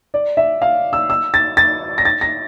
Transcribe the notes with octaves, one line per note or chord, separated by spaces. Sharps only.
D5
E5
F5
E6
E6
A6
A6
A#6
A6
A#6